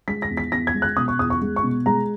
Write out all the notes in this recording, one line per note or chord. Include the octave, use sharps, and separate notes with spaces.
G#3 B6
A#6
E2
B6
E2 A#6
G#6
G#3
F#6
B2 D#6
C#6
E2 D#6
C#6
G#3
C#6
B2
G#3 A#5